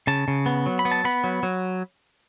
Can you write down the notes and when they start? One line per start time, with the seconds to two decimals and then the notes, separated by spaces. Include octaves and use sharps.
0.07 C#3 A5
0.28 C#3
0.46 B3
0.66 F#3
0.79 B5
0.85 B3
0.92 A5
1.05 B3 B5
1.24 F#3
1.43 F#3